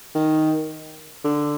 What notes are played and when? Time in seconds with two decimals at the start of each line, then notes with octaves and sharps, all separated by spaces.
0.15 D#3
1.25 D3